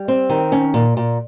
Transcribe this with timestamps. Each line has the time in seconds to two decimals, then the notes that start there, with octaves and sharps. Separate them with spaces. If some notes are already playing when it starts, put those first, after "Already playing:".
Already playing: G3
0.08 C4
0.29 D#3
0.52 C#4
0.74 A#2
0.97 A#2